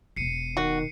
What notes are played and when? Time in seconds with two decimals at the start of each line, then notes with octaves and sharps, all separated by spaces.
0.16 E1 B2 C7 C#7 D#7
0.57 D#3 F#4 C#7